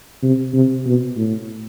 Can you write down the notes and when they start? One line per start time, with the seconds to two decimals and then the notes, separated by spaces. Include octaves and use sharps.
0.22 C3
0.54 C3
0.86 B2
1.17 A2